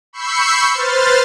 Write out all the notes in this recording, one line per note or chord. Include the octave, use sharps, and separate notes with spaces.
B5 C#6 E6 G6 C7 C#7
B4 C5 C6 F6 A6